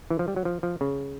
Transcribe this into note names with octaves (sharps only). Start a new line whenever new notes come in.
E3
F3
G3
F#3
F3
F3
C#3